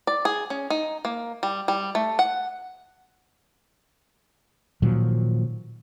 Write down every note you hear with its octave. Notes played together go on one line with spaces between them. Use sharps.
D5
G#4
C#4
D#4
A#3
G3
G3
A3
F#5
A#2 D#3 F3 F#3